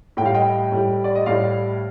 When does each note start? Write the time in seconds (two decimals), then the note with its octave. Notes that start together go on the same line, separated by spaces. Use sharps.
0.17 A2 G5
0.22 G3 F5
0.34 D#5 G5
0.72 A2 G3
1.04 D5
1.15 D#5
1.26 A2 G3 D5 F5